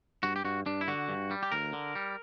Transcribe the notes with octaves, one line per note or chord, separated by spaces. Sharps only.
G2 F#4
G4
G2 F#4
G2 D4
E4
D3 F#4
G2
G3
G4
D2 A#4
D3
G3